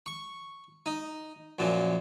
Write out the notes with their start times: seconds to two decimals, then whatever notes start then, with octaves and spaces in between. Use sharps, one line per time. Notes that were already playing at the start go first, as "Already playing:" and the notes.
0.06 C#6
0.86 D#4
1.59 F#2 A#2 F3